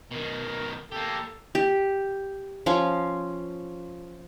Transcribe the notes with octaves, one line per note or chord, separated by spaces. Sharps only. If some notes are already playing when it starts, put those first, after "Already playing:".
B2 D#3 A#4
A#3 G4 A4
G4
F3 C#4 F4